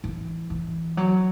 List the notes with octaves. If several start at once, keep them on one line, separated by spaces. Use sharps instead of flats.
E3
E3
F#3